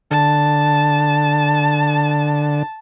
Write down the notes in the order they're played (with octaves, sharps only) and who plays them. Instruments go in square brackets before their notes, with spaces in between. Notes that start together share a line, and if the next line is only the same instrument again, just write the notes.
[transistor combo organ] D3 [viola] A5